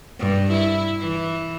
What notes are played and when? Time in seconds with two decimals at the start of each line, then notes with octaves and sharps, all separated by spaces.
0.20 G2
0.52 E4
1.01 E3